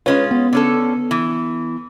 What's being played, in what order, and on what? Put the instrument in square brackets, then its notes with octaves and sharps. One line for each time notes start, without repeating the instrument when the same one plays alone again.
[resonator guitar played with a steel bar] G#3 C#4 F4 [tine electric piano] B4 C#5
[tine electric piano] B3
[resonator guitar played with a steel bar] D3 C#4 A4
E3